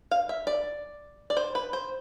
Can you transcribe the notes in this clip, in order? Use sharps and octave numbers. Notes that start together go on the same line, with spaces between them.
F5
E5
D5
D5
C5
B4
C5